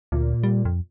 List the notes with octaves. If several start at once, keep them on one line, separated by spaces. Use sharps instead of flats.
D2 A#2
G3
F2